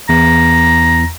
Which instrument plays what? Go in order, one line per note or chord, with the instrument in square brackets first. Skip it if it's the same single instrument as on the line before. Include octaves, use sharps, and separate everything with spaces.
[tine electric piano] E2 [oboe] A#5